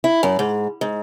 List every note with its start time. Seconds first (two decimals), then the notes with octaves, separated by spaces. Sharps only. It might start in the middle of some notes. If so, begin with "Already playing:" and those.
0.04 E4
0.23 F#2
0.39 G#2
0.81 G#2